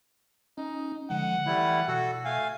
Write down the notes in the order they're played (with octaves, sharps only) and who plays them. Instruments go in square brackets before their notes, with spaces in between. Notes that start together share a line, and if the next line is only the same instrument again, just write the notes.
[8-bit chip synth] C#4 [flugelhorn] D#4
[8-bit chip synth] D3 F3 G#3 [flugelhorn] F#5
[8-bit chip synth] E3 [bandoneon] G3 A3 E4
[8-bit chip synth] B2 [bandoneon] F#4 A4
[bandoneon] A3 F5 [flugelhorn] G#5